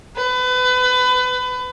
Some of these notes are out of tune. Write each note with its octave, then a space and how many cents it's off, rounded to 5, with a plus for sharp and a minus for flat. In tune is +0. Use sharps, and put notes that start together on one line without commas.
B4 +30